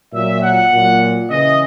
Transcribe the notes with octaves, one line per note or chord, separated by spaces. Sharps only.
A#2 F#3 E5
F#5
A#2 F#3
C#3 E3 D#5